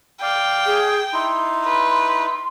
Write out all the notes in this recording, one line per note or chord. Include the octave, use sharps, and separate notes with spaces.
D5 F5 G5
G#4
D#4 E4 C6
B4